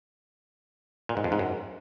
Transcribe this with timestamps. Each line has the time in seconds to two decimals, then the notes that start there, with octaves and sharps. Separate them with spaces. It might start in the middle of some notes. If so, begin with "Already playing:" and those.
1.09 A#2
1.17 G#2
1.24 F2
1.32 G#2
1.39 F#2